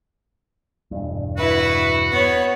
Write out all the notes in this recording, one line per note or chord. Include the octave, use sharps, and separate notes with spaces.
E1 G2
E4 F#4 B4
B3 C#5